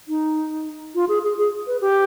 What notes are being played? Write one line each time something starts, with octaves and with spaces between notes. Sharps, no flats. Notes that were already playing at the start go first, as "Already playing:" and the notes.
D#4
F4
G#4
G#4
G#4
B4
G4